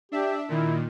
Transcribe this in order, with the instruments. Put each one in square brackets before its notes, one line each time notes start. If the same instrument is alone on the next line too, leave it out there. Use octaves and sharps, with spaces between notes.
[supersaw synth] D4 E5 [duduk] G4
[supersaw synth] A#2 D#3 [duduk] E4